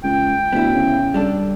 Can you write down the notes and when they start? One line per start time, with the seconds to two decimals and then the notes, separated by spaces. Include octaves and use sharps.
0.04 C#2 G5
0.53 D2 B3 E4
0.74 C#3
1.14 G3 D4 A4